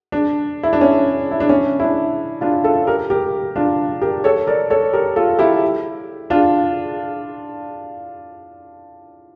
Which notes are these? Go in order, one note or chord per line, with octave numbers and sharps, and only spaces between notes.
D4
E4
D4
C#4
E4
D4
C#4
E4
D4
D4 F4
F4 A4
G4 A#4
G4 A#4
D4 F4
G4 A#4
A4 C#5
A#4 D5
A4 C#5
G4 A#4
F4 A4
E4 G4
D4 F4